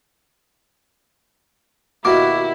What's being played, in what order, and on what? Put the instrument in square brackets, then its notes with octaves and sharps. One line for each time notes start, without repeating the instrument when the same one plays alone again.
[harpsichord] D#2 B2 A#3 [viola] E4 [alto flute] F#4 [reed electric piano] D6